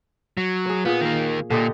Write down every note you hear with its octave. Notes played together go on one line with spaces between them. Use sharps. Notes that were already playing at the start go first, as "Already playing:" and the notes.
F#3
G#4 C#5
A#2 B3 G#4
D#3 A#3
A#2 D3 G4 D#5